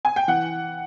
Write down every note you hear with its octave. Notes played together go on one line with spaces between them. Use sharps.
G#5
G5
E3 F#5